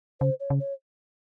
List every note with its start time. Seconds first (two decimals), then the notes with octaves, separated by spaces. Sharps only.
0.20 C#3 C5
0.40 C#5
0.50 C#3
0.60 C#5